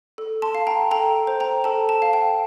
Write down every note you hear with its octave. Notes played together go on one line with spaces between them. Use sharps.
A4
A5 C6
F5
G5 A#5
A4 G5 A#5
C5
G5 A#5
A4 A5
A5
F5
G5